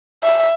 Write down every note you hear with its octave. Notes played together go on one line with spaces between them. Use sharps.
E5